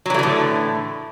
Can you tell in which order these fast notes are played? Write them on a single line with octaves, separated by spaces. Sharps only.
F#3 E3 A3 D3 A2